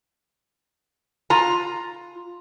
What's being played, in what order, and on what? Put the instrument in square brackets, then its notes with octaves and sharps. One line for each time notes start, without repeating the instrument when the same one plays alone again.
[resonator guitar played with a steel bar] F4 A#5